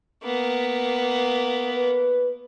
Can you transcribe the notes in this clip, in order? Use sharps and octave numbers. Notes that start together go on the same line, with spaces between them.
A#3 B3
B4